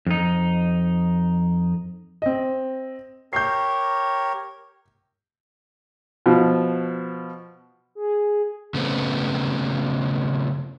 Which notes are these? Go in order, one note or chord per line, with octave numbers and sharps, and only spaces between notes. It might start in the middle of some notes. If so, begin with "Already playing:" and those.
F2 D#4
C4 D#5
G4 A#4 C#5 G6 C7
B2 F3
G#4
C#3 A3 B3 C4